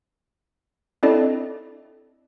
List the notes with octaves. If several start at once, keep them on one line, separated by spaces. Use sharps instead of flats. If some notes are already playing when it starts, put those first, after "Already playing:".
C4 D4 E4 A4 D5 D#5